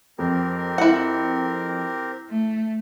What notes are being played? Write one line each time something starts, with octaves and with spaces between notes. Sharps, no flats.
F2 C4 G4 A#4
E4 F#5
A3